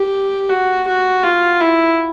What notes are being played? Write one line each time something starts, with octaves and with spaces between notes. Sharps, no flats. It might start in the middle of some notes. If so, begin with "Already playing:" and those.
Already playing: G4
F#4
F#4
F4
E4